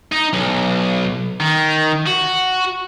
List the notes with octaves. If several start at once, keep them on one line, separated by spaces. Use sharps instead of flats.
D#4
B1
D#3
F#4